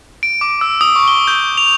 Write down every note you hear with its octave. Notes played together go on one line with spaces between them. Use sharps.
D7
D6
E6
D#6
C#6
G7
G6
F7